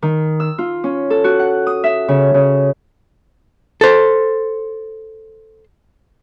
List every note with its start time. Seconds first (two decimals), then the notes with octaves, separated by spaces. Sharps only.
0.02 D#3
0.40 E6
0.58 F4
0.84 C#4
1.10 A4
1.24 F#4
1.39 F#5
1.67 D#6
1.84 E5
2.08 C#3
2.34 C#3
3.81 A4 C5